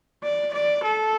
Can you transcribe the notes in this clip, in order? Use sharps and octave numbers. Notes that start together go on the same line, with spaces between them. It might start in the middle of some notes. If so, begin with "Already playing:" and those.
D5
D5
A4